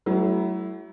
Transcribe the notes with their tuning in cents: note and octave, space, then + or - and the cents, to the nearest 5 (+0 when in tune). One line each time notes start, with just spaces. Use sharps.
F#3 +25 A3 -20 E4 +0